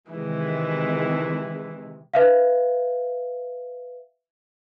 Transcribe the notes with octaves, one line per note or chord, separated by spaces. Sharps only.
C3 D#3 E3 G#3 E4
B4 E5 F5